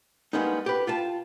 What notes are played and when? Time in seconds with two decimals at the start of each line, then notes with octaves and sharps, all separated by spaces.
0.33 G3 G#3 A#3 B3 C#4 D#4
0.66 G4 B4
0.87 F4 G5 A5